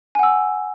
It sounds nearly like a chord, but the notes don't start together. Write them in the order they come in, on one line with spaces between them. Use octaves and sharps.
G#5 F#5 E6